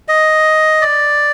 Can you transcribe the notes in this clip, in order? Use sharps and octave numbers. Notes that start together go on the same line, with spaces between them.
D#5
D5